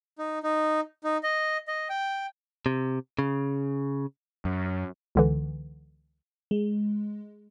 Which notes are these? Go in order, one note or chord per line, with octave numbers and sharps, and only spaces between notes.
D#4
D#4
D#4
D#5
D#5
G5
C3
C#3
F#2
C#2 D3 E3
G#3